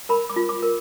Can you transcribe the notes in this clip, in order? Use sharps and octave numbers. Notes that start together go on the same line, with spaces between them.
A#4 B5
D6
F4
D6
A#4